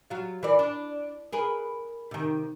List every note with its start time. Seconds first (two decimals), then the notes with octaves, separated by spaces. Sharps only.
0.10 F#3 F4
0.43 E3 A#4 D5
0.59 D4
1.33 G#4 A#4 B4
2.11 C3 D#3